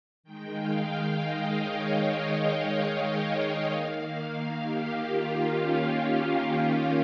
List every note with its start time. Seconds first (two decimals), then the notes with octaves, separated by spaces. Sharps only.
0.23 D#3 G#3 G5
0.53 F5
0.82 G5
1.11 D#5
1.54 C#5
1.99 D#5
2.42 G5
2.86 G5
3.29 F5
3.74 D#3 A#3
4.60 G4
5.04 F4
5.48 C#4
6.65 G4